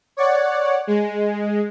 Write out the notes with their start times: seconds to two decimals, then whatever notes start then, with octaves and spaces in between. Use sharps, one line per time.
0.17 C#5 D5 F#5
0.87 G#3